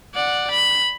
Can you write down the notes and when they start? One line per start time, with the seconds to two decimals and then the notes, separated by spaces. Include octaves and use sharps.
0.14 D5 F#5
0.51 B5